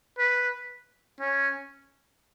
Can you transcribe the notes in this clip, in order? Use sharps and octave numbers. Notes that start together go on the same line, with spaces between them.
B4
C#4